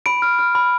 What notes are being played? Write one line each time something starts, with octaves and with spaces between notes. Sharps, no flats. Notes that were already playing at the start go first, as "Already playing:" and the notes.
B5 D7
F6
F6
B5